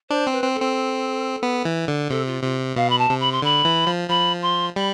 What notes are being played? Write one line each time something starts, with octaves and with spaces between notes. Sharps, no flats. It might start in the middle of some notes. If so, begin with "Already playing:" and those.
D4 C5
C4
B4
C4
A4
C4
B3
E3
D3
C3 A4
F4
C3 F4
B2 F5
B5
A5
C3
B5
C6
D3 B5
E3
F3
F3 B5
C6
G3 B5